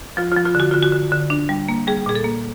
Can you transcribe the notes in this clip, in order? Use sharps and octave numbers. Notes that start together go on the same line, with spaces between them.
F3 F4
F4
F3
F4
D3 F#4
D3 F4
F#4
D3
D3
D4
G3
A#3
G3 G#4
A#2 G#4
A4
A#3